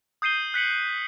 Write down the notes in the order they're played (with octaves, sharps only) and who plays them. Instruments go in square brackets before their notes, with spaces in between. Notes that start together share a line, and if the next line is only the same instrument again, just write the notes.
[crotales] D#6 G6 C7 D#7 G7
F#6 B6 C#7 F#7